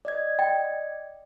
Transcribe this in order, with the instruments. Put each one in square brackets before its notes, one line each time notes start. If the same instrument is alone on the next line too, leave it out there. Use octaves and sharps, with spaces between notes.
[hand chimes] D5 D#5 G#6
[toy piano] G5